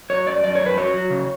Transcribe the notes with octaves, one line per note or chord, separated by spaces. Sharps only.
F#3 C#5
F#2 D5
F#2 D5
C#5
F#2
B4
F#3 C#5
F#3
C#3